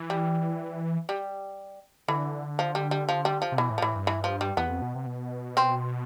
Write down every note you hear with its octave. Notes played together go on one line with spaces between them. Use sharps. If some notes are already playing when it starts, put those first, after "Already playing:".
Already playing: E3
G3
G3
D3 E3
F3
G3
G3
F3
G3
F3
C3
B2 E3
A2
F3
A2 E3
G2
E3
F3
G3
E2 B3
F2
B2
C3
B2
C4